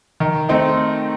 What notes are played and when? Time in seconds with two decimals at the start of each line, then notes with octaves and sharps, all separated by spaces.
0.20 D#3
0.49 A3 C4 D#4